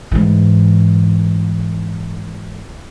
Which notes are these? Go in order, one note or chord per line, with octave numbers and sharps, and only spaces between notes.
G#2 E3